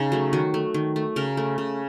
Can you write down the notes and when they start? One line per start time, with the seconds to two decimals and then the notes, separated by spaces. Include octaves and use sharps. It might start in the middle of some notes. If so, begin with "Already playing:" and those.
Already playing: C#3 D#4
0.12 F#3 A3
0.33 D#3 F#4
0.54 A3
0.74 D#3
0.96 A3
1.16 C#3 A#4
1.37 A3
1.58 C#3